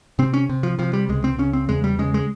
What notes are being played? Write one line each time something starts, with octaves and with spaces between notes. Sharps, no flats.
C3 C4
C#4
C3
F3
C3 F3
G3
C#2 G#3
C4
C#3 C#4
C4
E2 G#3
G3
C#3 G#3
G#3